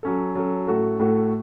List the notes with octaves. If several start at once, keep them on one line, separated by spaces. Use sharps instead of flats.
F#3 C#4 A4
F#3 C#4 A4
A2 A3 F#4 A4
A2 A3 F#4 A4